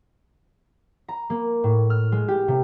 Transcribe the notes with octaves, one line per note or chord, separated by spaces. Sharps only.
A#5
A#3
A2
F6
G#3
G4
C3